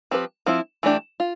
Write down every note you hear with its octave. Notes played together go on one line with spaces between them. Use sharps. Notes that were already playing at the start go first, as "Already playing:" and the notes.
F3 C4 G4 B4
F3 C4 E4
E3 A3 D4 G4
F4